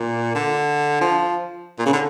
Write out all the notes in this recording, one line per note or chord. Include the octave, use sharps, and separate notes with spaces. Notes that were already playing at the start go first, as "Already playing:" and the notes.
Already playing: A#2
D3
F3
A#2
C#3
D3